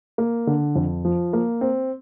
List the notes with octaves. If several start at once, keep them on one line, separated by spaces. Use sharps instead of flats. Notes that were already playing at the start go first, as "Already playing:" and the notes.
A#3
D3
F2
F3
A#3
C4